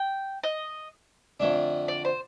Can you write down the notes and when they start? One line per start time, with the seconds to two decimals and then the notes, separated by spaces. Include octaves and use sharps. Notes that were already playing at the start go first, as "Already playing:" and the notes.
Already playing: G5
0.43 D#5
1.40 F2 D3 A3 D4
1.88 D5
2.05 C5